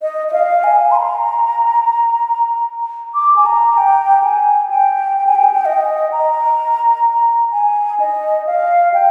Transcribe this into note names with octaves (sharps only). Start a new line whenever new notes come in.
D#5
D#5
F5
G#5
C6
A#5
D6
G#5
A#5
G5
G#5
G5
G5
G#5
G5
G#5
G5
D#5
A#5
G#5
D#5
F5
G5